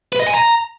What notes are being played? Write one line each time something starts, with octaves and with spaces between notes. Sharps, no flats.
B4
D#5
G#5
A#5